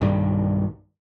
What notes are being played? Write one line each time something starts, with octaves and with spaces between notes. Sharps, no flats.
B1 G2 D#3 G3